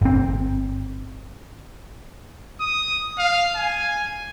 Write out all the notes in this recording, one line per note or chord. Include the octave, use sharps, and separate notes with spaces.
G1 C4
D#6
F5
G#5